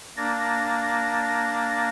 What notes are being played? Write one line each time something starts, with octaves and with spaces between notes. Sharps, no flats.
A#3 D4 A6 A#6